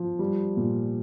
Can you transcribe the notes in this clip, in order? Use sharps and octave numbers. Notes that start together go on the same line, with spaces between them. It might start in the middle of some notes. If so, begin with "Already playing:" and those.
Already playing: F3
G3
A#2